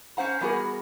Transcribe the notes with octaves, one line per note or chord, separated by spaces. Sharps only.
C#4 C5 F#5 A#5
E2 G3 B3 F#4 G#4 A#4